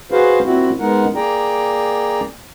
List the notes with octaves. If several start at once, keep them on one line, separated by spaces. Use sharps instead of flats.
F#4 G#4 B4 C5 F5
A#2 C4 E4 F#4
G#3 B3 D#4 A#4 F#5
A#3 G#4 D5 G5 A#5